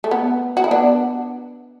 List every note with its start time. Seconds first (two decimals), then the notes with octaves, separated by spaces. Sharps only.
0.04 A3
0.11 B3
0.57 F#4
0.64 E4
0.71 B3 D4